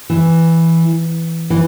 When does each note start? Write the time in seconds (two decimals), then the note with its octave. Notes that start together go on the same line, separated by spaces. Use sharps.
0.10 E3
1.50 E3